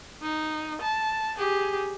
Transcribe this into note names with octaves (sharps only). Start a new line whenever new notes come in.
D#4
A5
G4 G#4